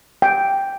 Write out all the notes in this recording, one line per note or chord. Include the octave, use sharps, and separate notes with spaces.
G5